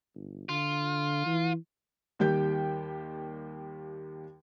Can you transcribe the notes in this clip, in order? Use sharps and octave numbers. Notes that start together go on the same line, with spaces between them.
G1
D3 F4
E3
D#2 D#3 G3 G4 G5 G6